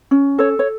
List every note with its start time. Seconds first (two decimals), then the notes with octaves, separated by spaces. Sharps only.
0.11 C#4
0.38 A4 C#5
0.59 C#5